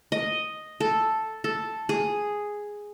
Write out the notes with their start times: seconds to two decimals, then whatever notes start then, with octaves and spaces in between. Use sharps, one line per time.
0.12 D#5
0.80 A4
1.44 A4
1.89 G#4